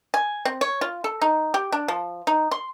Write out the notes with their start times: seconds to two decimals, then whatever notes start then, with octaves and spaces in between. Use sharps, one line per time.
0.14 G#5
0.45 C4
0.61 C#5
0.81 F4
1.04 A4
1.22 D#4
1.54 G4
1.72 D4
1.88 F3
2.27 D#4
2.51 C6